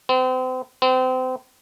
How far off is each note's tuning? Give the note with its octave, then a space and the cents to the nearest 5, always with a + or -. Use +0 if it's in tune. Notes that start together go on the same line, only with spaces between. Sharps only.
C4 -35
C4 -30